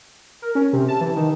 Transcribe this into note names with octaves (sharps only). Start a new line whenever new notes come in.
A#4
C#4
C3
A5
E3
D#3